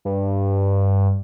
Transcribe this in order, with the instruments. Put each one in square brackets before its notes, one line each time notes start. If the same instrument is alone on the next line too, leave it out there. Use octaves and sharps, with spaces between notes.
[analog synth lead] G2